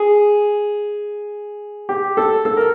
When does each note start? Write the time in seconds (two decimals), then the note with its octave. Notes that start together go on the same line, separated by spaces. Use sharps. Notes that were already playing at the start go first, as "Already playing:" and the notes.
Already playing: G#4
1.89 G4
2.17 A4
2.45 A4
2.57 A#4